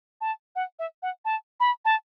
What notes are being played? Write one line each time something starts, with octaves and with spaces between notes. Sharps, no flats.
A5
F#5
E5
F#5
A5
B5
A5